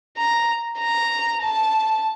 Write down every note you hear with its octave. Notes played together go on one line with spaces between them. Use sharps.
A#5
A#5
A5